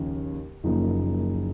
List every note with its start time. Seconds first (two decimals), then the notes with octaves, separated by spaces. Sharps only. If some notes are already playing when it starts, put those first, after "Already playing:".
Already playing: D#2 C#3 F3 D#4
0.64 F#1 F#2 F3 A#3 D#4